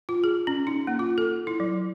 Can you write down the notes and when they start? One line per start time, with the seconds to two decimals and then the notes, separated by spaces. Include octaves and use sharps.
0.09 F4
0.24 G#4
0.47 C#4
0.67 D#4
0.87 A#3
0.99 F4
1.18 A4
1.47 E4
1.60 F#3